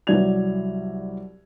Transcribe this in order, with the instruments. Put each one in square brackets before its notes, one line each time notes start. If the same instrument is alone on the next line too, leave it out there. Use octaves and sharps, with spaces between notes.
[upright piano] C2 F#3 D5 G#6 F7